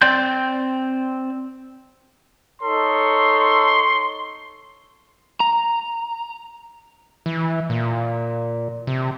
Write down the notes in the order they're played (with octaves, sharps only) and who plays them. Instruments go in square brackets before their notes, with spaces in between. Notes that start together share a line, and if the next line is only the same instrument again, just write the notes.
[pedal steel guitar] C4 D5 G5 C6 G6
[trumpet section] D#4 A4 C#5 [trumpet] C6
[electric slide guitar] A#5
[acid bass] E3
A#2
C3